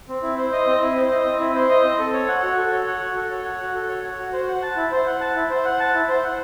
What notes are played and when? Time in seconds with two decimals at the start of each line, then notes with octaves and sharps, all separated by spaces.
0.09 C4
0.23 E4
0.38 C5
0.52 D#5
0.67 C4
0.81 E4
0.96 C5
1.11 D#5
1.25 C4
1.40 E4
1.55 C5
1.69 D#5
1.84 C4
1.99 A4
2.13 C#5
2.28 F#5
2.43 F#4
2.57 A4
2.72 C#5
2.87 F#5
3.01 F#4
3.16 A4
3.31 C#5
3.45 F#5
3.60 F#4
3.75 A4
3.89 C#5
4.03 F#5
4.19 F#4
4.33 C5
4.47 F#5
4.62 A5
4.76 E4
4.91 C5
5.06 F#5
5.21 A5
5.36 E4
5.50 C5
5.65 F#5
5.80 A5
5.94 E4
6.09 C5
6.24 F#5